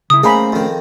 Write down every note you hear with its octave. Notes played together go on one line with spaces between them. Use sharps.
C#3 E4 D#6
A3 A#3 C#4 D#4 G#4 C5 A#5 B5
F2 D#3